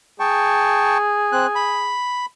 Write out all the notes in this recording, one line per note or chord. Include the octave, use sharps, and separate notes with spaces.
G#4 G5 A5 C#6
C4 F#6
B5